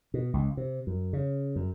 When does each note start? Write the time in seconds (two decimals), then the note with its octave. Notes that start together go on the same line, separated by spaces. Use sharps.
0.14 B2
0.34 C#2
0.57 C3
0.87 F#2
1.13 C#3
1.56 F#2